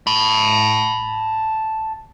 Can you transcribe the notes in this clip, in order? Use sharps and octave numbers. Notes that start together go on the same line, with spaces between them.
A5 B5